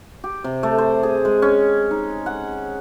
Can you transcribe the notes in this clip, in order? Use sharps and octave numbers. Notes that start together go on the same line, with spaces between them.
G4
C3
A3
C5
G#4
G#3
C#4
D#4
F#5